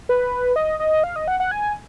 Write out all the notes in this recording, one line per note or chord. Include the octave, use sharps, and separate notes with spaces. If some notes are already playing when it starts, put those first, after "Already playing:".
B4
D#5
D#5
F5
D#5
F#5
F#5
G#5